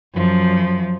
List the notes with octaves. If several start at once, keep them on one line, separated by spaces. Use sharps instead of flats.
F#2 F3